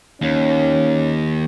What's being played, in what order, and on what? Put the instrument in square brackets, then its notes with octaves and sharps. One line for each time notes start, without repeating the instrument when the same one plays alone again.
[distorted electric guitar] D#2 [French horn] C#4